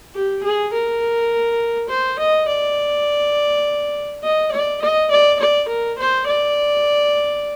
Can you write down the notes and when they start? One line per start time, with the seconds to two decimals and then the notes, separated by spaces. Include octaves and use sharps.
0.15 G4
0.43 G#4
0.73 A#4
1.89 C5
2.19 D#5
2.48 D5
4.23 D#5
4.51 D5
4.82 D#5
5.11 D5
5.39 D5
5.68 A#4
5.98 C5
6.26 D5